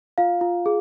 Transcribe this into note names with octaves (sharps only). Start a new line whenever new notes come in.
F4 F5
F4
G#4